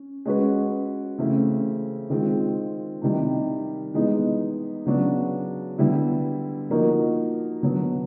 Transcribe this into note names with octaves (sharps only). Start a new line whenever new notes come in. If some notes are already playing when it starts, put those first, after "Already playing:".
Already playing: C#4
G#3 C#4 F#4 B4
C#3 E3 A3 C4 E4
D#3 G#3 C4 F4
C3 D#3 G3
E3 G#3 B3 D#4
C#3 F#3 B3 D4 F#4
D3 G3 B3 E4
F3 A#3 D#4 F#4 A#4
D3 F#3 B3